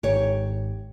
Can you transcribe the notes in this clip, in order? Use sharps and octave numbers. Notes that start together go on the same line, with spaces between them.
G#1 G#2 G4 C#5